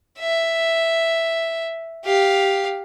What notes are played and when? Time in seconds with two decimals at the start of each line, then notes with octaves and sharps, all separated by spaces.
0.19 E5
2.04 G4 F5